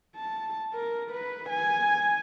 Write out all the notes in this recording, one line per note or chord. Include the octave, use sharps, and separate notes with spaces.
A5
A#4
B4
G#5